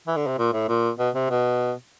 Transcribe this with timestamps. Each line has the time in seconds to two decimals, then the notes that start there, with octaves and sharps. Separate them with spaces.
0.07 E3
0.17 D3
0.27 C3
0.38 A#2
0.53 A2
0.68 A#2
0.99 B2
1.15 C3
1.30 B2